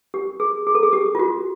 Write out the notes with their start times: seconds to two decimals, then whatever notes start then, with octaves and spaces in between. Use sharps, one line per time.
0.14 G4
0.40 G#4
0.67 G#4
0.75 A4
0.83 G#4
0.93 G4
1.15 F4
1.19 F#4